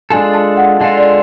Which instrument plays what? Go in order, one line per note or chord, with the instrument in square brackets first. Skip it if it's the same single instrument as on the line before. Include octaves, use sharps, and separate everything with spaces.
[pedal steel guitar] G#3 D4 F4 A4 [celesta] G#5
[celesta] A5
F#5
[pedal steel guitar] G#3 D4 F4 A4 [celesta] F5
[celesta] D5